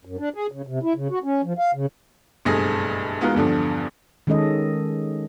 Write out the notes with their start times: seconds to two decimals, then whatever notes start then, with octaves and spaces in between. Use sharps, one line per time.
0.05 F#2
0.19 D4
0.34 G#4
0.52 C#3
0.67 C3
0.83 E4
0.96 C#3
1.11 F#4
1.24 C#4
1.44 F3
1.59 F5
1.74 C#3
2.45 F#1 B1 G2 A3 G#4 A#6
3.21 G#3 B3 D#4 F4 F#4 A#4
3.35 E2 G2 D3 F3
4.27 D#3 G#3 C#4 A4 D#5